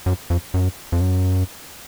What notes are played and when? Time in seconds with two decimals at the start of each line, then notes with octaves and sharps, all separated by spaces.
0.06 F#2
0.30 F2
0.54 F#2
0.92 F2
1.01 F#2